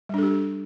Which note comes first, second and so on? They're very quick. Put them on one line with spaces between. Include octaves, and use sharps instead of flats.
G3 D4 A4 G4